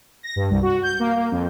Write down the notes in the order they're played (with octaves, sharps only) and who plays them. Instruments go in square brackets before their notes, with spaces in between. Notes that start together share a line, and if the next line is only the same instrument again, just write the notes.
[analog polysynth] A#6
G2
C2
F#4
G6
A#3
A#3
F2